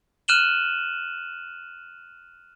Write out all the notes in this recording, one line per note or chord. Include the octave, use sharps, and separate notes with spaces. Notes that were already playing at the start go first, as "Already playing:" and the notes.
F6 F#6 D#7 E7 F#7 G7